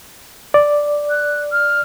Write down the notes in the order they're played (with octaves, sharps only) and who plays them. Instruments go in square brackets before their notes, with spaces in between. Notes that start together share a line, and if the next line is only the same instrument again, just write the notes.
[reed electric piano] D5
[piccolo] F#6
F6